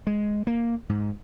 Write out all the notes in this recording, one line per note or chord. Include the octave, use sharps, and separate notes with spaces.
G#3
A#3
G#2